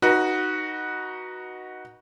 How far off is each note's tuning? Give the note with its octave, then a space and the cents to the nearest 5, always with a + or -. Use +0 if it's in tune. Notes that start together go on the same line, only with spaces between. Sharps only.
D#4 +0 F#4 +0 B4 -25